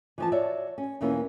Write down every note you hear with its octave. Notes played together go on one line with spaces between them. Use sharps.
E3 F3 A5
F#4 C#5 D5 E5
C#4
E2 B2 E3 A#3 C#4 E4